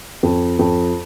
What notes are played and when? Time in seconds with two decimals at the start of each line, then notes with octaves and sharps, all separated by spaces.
0.23 F2
0.59 F2